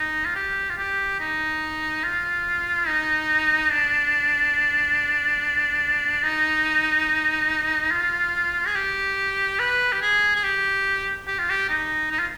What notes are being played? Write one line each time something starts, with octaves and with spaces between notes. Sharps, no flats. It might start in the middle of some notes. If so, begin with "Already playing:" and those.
Already playing: D#4
F4
G4
F4
G4
D#4
F4
D#4
D4
D#4
F4
G#4
G4
B4
G4
G#4
G#4
G4
G4
F4
G4
D#4
D#4
F4